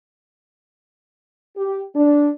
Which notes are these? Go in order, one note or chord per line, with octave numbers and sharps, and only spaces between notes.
G4
D4